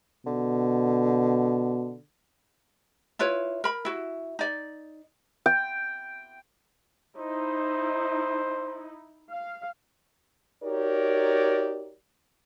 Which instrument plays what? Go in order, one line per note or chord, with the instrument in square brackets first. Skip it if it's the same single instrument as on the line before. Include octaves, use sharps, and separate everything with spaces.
[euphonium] B2 [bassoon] D3
[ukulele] E4 F4 B4 C#5
A#4 B5
E4 F#4
D#4 D5
[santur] G5
[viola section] D#4 E4 [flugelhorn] C5
[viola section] F5
[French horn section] D#4 F#4 G4 A#4 C#5 D5